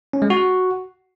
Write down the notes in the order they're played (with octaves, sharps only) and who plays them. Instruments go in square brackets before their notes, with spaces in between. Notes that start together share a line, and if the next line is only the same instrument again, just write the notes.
[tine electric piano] C#4
G#3
F#4